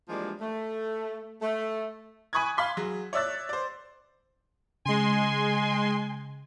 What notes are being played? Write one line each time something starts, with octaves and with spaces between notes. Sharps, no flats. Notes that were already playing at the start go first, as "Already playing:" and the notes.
E3 F3 G3 G#3 A#3 D4
A3
A3
G#5 B5 C#6 D#6 F#6 G#6
F5 B5 C6 B6
F#3 G#4
C#5 D5 E5 E6 F#6 A6
C5 D5
C#3 G#3 G#5 C6